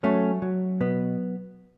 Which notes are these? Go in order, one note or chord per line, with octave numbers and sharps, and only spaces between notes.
F#3 A3 C#4
F#3
B2 B3